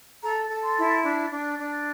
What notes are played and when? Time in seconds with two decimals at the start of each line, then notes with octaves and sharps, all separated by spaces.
0.23 A4 A#5
0.49 A4
0.63 C6
0.77 E4
1.04 D4
1.31 D4
1.58 D4